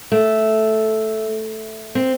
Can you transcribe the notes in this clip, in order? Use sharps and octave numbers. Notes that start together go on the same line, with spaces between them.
A3
C4